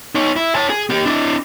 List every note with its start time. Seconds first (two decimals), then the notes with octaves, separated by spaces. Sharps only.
0.15 D#4 C#5
0.36 E4
0.55 C#5 A5
0.70 G#4
0.90 A#3 G4
1.05 D4 E4